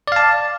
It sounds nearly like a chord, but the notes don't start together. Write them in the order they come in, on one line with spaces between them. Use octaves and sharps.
D5 F5 A5